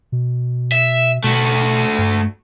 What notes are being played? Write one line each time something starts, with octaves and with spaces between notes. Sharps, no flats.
B2
E5
B2 A3 F#4
G2